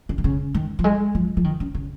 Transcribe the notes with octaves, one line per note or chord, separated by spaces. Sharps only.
C#3
D#3
C#3
D#3
F3
G#3
F3
F3
D#3
C#3
C#3